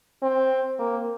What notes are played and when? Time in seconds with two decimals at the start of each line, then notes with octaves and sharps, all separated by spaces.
0.22 C4
0.79 A#3